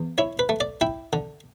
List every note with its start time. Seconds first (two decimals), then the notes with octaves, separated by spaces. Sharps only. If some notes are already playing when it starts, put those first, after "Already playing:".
Already playing: E2
0.18 E4 C#5
0.39 B4
0.49 A3
0.60 D5
0.81 E4 G5
1.13 D3